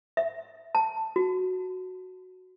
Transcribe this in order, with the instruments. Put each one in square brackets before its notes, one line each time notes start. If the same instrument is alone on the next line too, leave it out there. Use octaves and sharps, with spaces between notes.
[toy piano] E5
A5
F#4